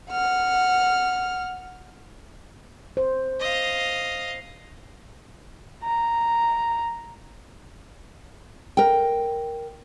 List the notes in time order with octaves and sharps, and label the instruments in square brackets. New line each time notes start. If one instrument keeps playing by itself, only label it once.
[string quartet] F#5 F6
[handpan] C5
[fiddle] D#5 F5
[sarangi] A#5
[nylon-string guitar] A#4 G5